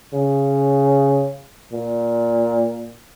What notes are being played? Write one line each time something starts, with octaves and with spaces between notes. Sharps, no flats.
C#3
A#2